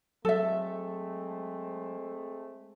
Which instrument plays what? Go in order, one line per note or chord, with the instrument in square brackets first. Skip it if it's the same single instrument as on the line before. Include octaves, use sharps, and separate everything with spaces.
[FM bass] F#3 [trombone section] G#3 A3 C4 [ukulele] A4 E5